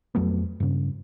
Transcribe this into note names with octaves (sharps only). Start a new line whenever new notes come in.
F2 F#3 A3 B3
G2 C#3